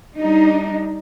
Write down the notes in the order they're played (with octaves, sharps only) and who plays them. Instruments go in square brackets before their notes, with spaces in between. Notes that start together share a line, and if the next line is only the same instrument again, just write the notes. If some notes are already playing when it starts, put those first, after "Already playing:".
[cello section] G3 D4 D#4